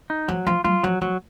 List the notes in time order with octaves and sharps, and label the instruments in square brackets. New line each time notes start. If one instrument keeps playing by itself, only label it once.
[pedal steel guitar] D#4
[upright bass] F3 [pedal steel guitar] F#3
[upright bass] F3 [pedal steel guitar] F4
[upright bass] F#3 [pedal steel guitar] F4
[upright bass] F3 [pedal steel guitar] F#3
[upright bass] F3 [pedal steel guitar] F#3